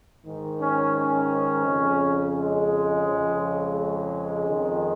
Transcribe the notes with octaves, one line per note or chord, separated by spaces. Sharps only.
G#2 D#3
C#4
C#4
F2 C#3
G#3
F2 C#3
G#3
F2 D#3